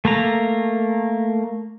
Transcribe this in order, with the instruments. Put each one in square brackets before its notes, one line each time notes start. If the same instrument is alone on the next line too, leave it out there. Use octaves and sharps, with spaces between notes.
[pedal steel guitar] A3 A#3 A#5